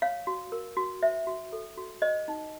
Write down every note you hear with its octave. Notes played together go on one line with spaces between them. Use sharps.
C#5 F5
F#4
A#4
F#4
C5 E5
F#4
A4
F#4
C5 D#5
D#4